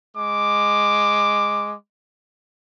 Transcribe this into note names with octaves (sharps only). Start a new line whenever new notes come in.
G#3 D6